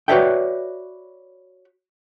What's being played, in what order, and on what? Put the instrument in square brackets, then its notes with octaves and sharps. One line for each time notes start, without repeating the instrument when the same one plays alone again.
[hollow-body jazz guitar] F#4 B4 C#5 D5 E5 G5